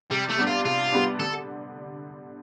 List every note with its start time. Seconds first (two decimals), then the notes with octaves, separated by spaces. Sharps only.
0.11 C3 G3
0.29 A3
0.37 G3 B3 D4
0.47 F4
0.65 C3 F4
0.92 G3 B3 D4
1.19 D3 A4